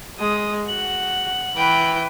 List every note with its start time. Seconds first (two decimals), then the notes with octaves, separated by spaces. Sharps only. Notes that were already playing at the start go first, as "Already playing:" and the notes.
0.20 G#3 D#6
0.68 F#4 F#5 F#7
1.57 E3 B4 G5